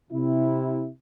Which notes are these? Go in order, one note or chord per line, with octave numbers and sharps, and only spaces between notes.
C3 E4